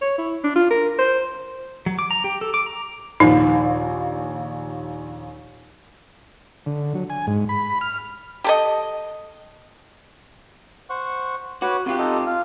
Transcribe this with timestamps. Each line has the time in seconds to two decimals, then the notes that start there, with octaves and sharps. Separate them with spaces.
0.01 C#5
0.18 E4
0.44 D4
0.56 F4
0.71 A#4
0.99 C5
1.86 F#3
1.99 D6
2.11 A#5
2.24 G4
2.41 A4
2.54 D6
2.66 A#5
3.20 A#1 D#2 D#4
6.66 D3
6.95 F#3
7.10 G#5
7.27 G#2
7.49 B5
7.81 F6
8.44 G4 A4 D#5
10.90 C5 F#5 C#6
11.62 F#4 B4 C#5 D6
11.86 C3 F4 G4 F#6
11.99 D#4 A4 D#5
12.26 F4 F5